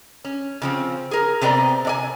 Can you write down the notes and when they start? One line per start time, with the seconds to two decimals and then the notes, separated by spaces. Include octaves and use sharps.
0.25 C#4
0.62 C#3 F3 C4
1.11 G#4 A#4
1.41 C3 B3 C4 A#4 D5 A#5
1.85 C3 D5 G#5